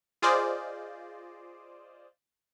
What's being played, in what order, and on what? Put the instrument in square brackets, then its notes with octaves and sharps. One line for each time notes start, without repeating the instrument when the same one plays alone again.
[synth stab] F4 G#4 C5 D5 D#5